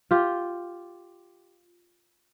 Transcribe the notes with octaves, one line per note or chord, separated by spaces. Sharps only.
F4 G4